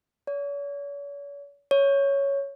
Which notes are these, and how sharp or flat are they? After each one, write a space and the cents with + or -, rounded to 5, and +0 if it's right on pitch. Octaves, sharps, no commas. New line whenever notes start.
C#5 +45
C#5 +5